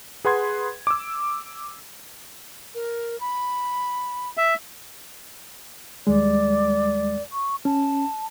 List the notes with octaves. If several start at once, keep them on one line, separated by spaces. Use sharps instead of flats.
G#4 B4 F#5 C6 G#6
D6 E6
A#4
B5
E5
D#2 G3 G#3 D5
C#6
C#4 A5